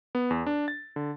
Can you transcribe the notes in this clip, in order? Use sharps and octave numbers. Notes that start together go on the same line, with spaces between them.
B3
E2
D4
A6
D3